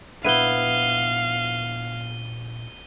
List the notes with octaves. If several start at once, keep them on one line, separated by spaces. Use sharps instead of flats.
A#2 B3 D4 E4 F5 D#7 G7